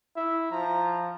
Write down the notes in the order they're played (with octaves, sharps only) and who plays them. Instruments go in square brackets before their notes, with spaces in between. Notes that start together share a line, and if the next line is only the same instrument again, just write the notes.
[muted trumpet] E4 [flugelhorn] E5
[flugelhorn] F3 [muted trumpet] A#5